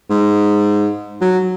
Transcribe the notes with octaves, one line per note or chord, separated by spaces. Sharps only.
G#2
F#3